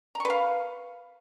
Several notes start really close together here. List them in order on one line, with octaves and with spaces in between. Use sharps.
A#5 C#6 B4 F5